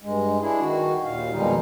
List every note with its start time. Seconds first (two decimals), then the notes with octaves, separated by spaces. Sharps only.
0.01 G2 G#3
0.41 D4 E4 G#4
0.60 D#3 F#4
1.05 D#2 A#2 F5
1.32 F2 B2 D#3 G3 G#3 D#4